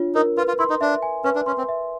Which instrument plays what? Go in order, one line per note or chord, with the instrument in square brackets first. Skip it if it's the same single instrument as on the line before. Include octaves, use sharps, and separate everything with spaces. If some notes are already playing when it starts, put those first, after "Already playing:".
Already playing: [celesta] D4 F4 C#5
[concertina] D#4 [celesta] A#4
[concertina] F4 [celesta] B4
[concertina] F4
[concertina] E4 [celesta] C6
[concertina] D#4
[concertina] D4 [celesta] E5
[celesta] G#5
[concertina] C#4 [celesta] B4
[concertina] D4
[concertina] C#4 [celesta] C6
[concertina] C4
[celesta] E5